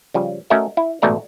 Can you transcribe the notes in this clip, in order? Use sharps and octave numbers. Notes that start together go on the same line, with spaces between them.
C#3 F3 G3
A3 C#4 F#4 A#4 D#5 E5
E4
A1 G#2 B2 A3 D5 A#5